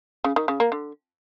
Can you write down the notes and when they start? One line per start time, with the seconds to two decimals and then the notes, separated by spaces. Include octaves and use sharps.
0.24 C#3
0.36 D#3
0.48 C#3
0.60 A#3
0.72 D3